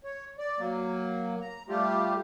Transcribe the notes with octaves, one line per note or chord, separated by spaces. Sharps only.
C#5
D5
F#3 A#3
A#5
G3 A3 F4 G4